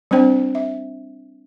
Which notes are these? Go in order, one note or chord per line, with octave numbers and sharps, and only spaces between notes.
G3 C4 D4 C5 G5
E5